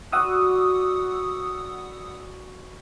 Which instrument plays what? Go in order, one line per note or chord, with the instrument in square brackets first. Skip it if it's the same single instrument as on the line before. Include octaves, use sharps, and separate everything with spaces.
[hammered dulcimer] E3 F#4 D5 [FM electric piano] F#5 D#6 E6